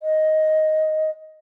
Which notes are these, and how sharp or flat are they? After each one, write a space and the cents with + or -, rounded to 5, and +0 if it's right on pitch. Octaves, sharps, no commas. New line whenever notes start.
D#5 +5